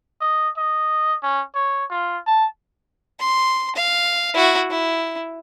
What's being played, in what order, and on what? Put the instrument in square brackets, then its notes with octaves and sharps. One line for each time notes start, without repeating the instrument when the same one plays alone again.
[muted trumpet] D#5
D#5
C#4
C#5
F4
A5
[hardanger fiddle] C6
F5
E4 F#4
E4